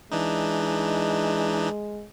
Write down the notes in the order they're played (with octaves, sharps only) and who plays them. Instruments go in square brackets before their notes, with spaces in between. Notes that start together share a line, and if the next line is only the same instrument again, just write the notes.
[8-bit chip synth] E3 D4 D#4 [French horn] G#3